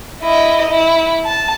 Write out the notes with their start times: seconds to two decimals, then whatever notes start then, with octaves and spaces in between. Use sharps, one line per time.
0.22 E4 D#5
0.70 E4
1.25 A5